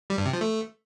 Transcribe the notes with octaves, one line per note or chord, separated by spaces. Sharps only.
G3
G2
C3
F3
A3